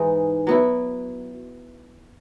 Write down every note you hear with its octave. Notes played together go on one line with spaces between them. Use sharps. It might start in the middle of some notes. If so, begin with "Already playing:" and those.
Already playing: G#2 E3 G#3 D#4
F#3 B3 E4